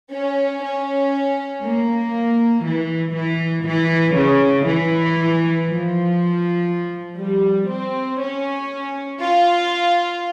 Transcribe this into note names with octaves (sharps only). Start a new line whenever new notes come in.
C#4
C#4
A#3
E3
E3
E3
C#3
E3
F3
G3
C4
C#4
F4